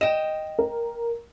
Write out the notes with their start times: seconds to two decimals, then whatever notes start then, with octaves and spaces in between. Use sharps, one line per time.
0.01 D#5 G5 E7
0.59 A#4